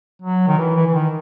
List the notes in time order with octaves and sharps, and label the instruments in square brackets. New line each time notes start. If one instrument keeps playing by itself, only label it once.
[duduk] F#3
D#3
E3
E3
E3
D#3